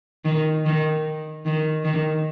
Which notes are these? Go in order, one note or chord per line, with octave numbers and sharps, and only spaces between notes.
D#3
D#3
D#3
D#3